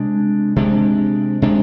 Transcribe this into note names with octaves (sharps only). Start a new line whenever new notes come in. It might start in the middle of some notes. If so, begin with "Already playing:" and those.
Already playing: C3 G#3 D4
C3 G#3 D4
C3 G#3 D4